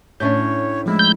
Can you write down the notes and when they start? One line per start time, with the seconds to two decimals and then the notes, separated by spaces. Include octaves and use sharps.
0.20 A2 C#4 D4 C#5 G6
0.86 F3 G#3 A3 E4
0.99 G6